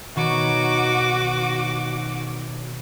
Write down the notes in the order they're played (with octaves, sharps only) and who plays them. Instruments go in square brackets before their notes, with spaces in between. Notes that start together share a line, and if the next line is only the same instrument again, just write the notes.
[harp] B2 D#3 C#5 [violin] F#4 D6